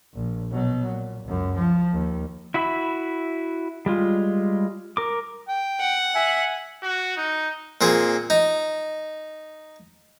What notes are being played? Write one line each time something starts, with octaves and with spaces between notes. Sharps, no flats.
A#1
B2 F#3
A#2
C#2 F#2
F3
D#2
E4 F#4 E5 B5
G3 G#3 F4
A#4 D6
G5
F#5
E5 G#5
F#4
D#4
A#2 C4 G#4
D#4